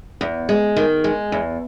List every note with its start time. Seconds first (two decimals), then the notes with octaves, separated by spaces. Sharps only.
0.21 E2
0.49 G#3
0.76 D#3
1.04 G#3
1.32 E2